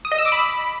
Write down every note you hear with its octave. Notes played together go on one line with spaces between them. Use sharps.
D#6
D#5
E6
D6
B5